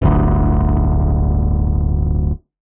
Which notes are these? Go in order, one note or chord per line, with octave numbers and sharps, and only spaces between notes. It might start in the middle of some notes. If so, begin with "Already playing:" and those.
D1 G1 D2